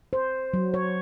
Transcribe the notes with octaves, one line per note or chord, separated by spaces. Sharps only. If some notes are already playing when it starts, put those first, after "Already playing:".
C5
F#3
C#5